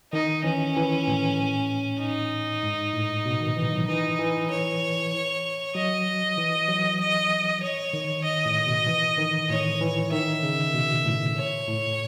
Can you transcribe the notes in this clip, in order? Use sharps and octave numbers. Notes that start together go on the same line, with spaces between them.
D#3 D#4
E3 C#4
E3
A2
D#4
G#2
A2
B2
D#3
E3
F#3
E3 D#4
E3
C#5
F#3 D#5
E3
F#3
D#5
C#5
D#3
D#5
A2
B2
E3
D#3
A2 C#5
E3
D#3 E5
C#3
B2
A2
C#5
A2